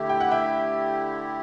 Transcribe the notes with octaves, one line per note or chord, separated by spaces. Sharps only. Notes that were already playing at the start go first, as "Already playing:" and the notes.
Already playing: D3 A3 E4 G4
G5
F#5
E5 G5